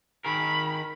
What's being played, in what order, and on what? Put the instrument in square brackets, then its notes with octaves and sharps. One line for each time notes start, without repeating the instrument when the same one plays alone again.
[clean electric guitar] D#3 G#4 A#4 [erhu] B5